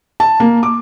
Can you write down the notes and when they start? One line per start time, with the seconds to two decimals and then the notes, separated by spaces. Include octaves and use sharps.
0.20 A5
0.40 A#3
0.63 D6